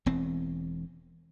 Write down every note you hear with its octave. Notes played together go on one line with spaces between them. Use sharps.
E1 E2 C4